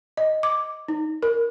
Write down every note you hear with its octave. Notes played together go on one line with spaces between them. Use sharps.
D#5
D6
D#4
A#4